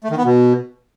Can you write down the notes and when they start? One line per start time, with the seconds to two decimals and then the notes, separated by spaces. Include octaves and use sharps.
0.04 A3
0.11 D#3
0.18 B3
0.24 B2